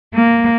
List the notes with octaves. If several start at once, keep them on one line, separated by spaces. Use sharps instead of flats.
A#3